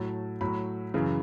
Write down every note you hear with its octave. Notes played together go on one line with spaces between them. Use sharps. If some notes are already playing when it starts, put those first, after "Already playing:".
Already playing: A2 F#3 A5
A2 F#3 B5
F#2 C#3 E3